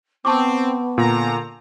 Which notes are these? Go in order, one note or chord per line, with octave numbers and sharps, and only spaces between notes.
B3 C4 A5 C#6 D6
A#2 D3 A#5